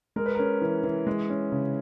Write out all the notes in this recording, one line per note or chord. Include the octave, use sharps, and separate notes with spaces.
G#3 A#4
B4
C#4 A#4
E3
E3
G#3
C#4
C#3